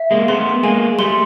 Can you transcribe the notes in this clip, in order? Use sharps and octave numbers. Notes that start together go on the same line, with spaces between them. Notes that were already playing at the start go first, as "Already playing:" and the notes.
Already playing: E5
G#3 A#3
A3 B3 C6
G#3 A#3 G#5
G3 A3 C6